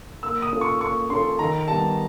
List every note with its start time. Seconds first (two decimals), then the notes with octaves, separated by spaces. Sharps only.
0.23 A#3 E6
0.42 D#6
0.52 C#4 F4 A4 C#5
0.61 C#6
0.81 A#3 C#6
1.10 C#4 F4 A4 C#5 C6
1.39 D#3 A#5
1.68 G3 B3 A5